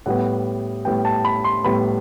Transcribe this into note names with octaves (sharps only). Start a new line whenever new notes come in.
A2 G3 B3 F#5
A2 G3 B3 G5
A5
B5
C6
A2 G3 B3 B5